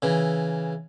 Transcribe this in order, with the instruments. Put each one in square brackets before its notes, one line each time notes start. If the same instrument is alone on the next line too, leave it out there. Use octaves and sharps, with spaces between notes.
[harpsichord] C#3 E3